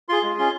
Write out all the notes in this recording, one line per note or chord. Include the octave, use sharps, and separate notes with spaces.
F4 G#4 C6
G#3
C#4 F4 G#4 C6